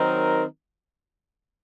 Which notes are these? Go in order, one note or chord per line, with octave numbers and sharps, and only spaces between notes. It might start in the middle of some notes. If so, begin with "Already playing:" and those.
Already playing: D#3 F#3 C4 D#4 A#4